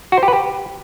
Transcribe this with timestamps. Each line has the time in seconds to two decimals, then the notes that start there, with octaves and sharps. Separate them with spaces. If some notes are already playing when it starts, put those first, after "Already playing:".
0.12 F#4
0.17 C5
0.23 G4
0.28 B4
0.33 G4